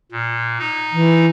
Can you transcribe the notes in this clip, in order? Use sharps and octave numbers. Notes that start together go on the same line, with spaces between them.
A#2
D#4
E3